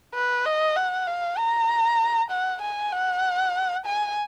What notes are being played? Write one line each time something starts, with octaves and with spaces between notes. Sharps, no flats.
B4
D#5
F#5
F5
A#5
F#5
G#5
F#5
G#5